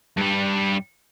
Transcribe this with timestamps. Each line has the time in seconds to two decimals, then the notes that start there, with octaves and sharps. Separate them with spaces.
0.17 G2 G3